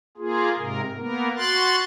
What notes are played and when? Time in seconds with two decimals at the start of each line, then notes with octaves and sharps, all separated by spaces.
0.17 A#3 F4 G#4
0.56 G#2 C3 A#4
0.96 A#3 B3 A#4
1.37 F#4 C6 F#6 A6